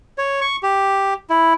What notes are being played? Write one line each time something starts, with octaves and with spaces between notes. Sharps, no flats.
C#5
C#6
G4
E4